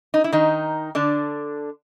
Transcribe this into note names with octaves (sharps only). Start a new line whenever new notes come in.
D#4
E4
D#3 D#4
D3 D4